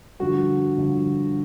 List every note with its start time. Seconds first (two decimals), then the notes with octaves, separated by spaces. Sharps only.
0.19 G2 D3 F3 F#4
0.78 G2 D3 F3